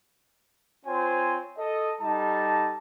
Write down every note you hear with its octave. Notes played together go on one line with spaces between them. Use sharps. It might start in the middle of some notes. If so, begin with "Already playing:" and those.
C4 F4 C5 C#5 G#5
A4 D#5
G3 D#4 A4 A5